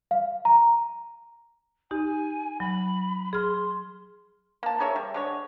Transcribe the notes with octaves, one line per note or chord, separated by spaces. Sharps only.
F5
A#5
D#4 G4 G#5
F#3 B5
G#4 C6 F6
A#3 A5
G#4 A#4 C#5 E5
G3
D3 G#3 C#5